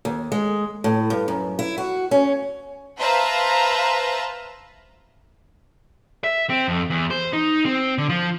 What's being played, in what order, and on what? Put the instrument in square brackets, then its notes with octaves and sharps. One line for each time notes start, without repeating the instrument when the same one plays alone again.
[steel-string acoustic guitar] D#2
G#3
A2
G2
F#2
E4
F#4
C#4
[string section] B4 C5 E5 F5 A5 A#5
[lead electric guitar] E5
C4
F2
E2
C5
D#4
C4
D3
F3